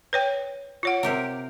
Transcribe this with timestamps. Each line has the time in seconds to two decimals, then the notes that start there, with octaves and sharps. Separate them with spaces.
0.13 B4 C#5 G5
0.83 F4 C#5 F#5
1.03 C3 G4 A#4